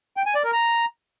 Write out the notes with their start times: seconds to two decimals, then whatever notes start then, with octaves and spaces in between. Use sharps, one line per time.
0.17 G5
0.26 G#5
0.35 D5
0.44 A#4
0.53 A#5